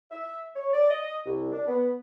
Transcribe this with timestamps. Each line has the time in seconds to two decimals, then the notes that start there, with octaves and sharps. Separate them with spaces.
0.11 E5
0.55 C#5
0.73 D5
0.90 D#5
1.25 C2
1.52 D4
1.67 B3